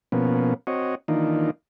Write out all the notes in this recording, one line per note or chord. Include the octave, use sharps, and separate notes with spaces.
B2 F3 A#3 B3 C#4
C4 F#4 C#5 D#5
D#3 E3 A#3 D4 D#4 F4